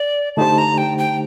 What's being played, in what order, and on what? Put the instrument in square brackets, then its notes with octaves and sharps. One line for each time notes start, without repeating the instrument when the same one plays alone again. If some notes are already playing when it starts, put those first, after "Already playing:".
Already playing: [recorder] D5
[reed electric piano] D3 A3 D#4 G4 C5 [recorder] A5
[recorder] A#5
G5
G5